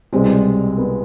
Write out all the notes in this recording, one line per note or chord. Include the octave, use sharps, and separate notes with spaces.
C2 B2 G3 G#3 C4 G4
B3